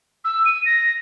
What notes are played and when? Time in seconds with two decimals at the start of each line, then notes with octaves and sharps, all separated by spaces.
0.25 E6
0.46 D#7
0.66 A#6